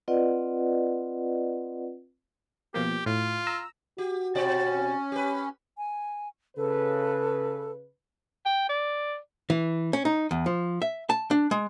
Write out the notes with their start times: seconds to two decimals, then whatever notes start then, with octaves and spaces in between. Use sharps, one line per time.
0.08 C4 F4 B4 D5 D#5 F#5
2.74 B2 F3 A#3 G4
3.06 A2 F4
3.47 A#5 E6
3.98 F#4 G4
4.35 B2 C4 C#4 D5
5.12 G4 B4
5.77 G#5
6.57 C#3 A4 B4
8.46 G5
8.69 D5
9.50 E3
9.93 C#4
10.05 D#4
10.31 E2
10.46 F3
10.82 E5
11.10 A5
11.31 D4
11.51 G#3